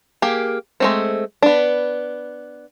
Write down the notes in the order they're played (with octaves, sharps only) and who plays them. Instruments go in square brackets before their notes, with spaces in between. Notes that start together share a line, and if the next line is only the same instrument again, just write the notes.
[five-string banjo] A#3 G4 G#4
G#3 A3 C4
B3 D4